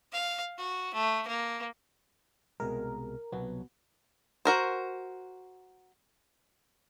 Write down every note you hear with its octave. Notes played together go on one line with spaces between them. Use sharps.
F5
F#4
A3
A#3
C2 B2 G#3 A#4
C2 B2 F#3 B3
F#4 A#4 C5